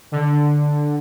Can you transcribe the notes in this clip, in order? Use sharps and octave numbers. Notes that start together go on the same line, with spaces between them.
D3